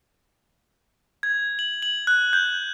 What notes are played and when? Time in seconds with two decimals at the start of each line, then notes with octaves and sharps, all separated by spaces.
1.23 G#6
1.59 F#7
1.82 F#7
2.07 F#6
2.33 G6